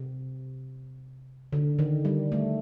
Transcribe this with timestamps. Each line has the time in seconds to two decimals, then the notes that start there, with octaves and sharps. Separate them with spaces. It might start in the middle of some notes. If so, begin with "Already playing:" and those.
Already playing: C3
1.53 D3
1.79 D#3
2.05 G3
2.32 A3